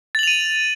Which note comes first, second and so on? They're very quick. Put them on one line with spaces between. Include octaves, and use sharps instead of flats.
A6 F#7 F7 D#7